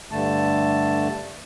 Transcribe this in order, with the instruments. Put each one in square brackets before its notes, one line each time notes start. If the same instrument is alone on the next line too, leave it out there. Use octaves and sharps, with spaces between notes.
[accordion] G2 D3 A3 A5